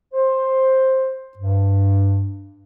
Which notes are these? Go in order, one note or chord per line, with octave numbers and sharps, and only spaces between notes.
C5
G2